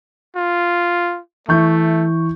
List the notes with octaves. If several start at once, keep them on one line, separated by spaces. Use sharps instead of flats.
F4
E3 A3 C#6 G6